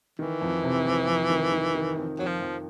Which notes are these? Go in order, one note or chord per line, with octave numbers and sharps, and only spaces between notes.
D#3 E3
F2
C3
F2
F2
D#3
D#3
D#3
F2
F2 F#3
F3
F2